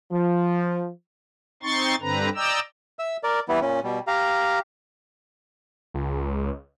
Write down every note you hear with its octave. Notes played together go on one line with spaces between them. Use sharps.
F3
C4 D#4 C6 C#6 A6
G2 D3 C4 B4 A#5
D5 D#5 G5 A#5 E6
E5 E6
A#4 D5
E3 G3 B3 E4
A#2 C#4
B2 G3
G4 F5 A#5
C#2